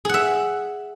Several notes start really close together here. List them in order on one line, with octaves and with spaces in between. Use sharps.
G#4 F#5 E5